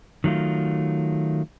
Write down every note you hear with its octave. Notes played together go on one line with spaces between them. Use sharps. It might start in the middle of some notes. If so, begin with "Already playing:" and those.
D#3 F#3 A3 F4